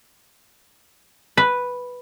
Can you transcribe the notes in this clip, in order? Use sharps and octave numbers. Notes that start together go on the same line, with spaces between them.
B4